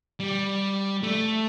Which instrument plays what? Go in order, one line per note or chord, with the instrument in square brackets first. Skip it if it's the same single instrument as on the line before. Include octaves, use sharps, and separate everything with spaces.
[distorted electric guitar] G3
A3